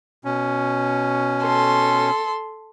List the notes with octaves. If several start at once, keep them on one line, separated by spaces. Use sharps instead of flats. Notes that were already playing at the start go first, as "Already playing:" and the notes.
B2 C#4
A4 C6